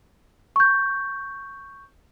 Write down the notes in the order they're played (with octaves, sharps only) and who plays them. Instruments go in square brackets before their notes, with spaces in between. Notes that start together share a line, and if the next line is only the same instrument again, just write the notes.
[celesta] C#6 G6